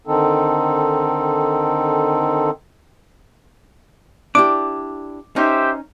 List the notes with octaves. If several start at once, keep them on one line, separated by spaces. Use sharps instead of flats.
D3 D#3 C4 D#4 A4
D4 E4 G4 D6
C#4 D#4 G4 C5 E5